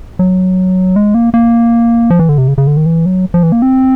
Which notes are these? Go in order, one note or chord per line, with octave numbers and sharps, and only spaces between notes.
F#3
G#3
A#3
A#3
F3
E3
D3
C3
C#3
C#3
D3
D#3
E3
F#3
F3
E3
A#3
C4